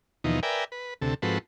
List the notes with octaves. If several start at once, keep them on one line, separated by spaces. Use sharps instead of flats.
D#2 B2 E3 F3 D#4
A#4 B4 D5 E5 G5 G#5
B4
D2 C3 A4
G#2 F3 C4 F#4 A4 B4